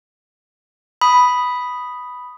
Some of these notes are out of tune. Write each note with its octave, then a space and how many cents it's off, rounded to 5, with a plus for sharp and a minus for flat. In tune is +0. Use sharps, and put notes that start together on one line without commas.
B5 +0 D#6 +0